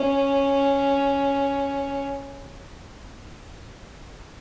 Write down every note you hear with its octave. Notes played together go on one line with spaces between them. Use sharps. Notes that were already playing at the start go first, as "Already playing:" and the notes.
Already playing: C#4